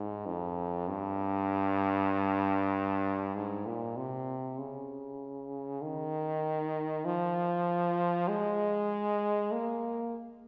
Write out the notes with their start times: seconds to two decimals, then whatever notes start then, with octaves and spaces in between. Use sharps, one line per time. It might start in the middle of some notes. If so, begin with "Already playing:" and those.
Already playing: G#2
0.26 F2
0.88 G2
3.35 G#2
3.66 A#2
3.97 C3
4.59 C#3
5.82 D#3
7.05 F3
8.28 G#3
9.52 A#3